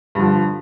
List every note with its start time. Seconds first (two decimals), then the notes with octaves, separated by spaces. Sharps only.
0.15 G2 D3 F3